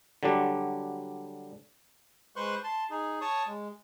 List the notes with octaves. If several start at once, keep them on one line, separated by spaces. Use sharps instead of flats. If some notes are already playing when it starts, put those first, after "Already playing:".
D3 F#3 G3 D4
G#3 B4 C5 C6 C#6 F#6
A5 C6
D#4 G#4
C#5 A5 C#6 D#6
G#3